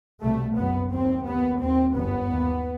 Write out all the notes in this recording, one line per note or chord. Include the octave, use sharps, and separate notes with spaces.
C2 B2 A3
F#1 F#2 B3
D#2 C4
D#2 B3
D#2 C4
G1 F#2 B3
D#2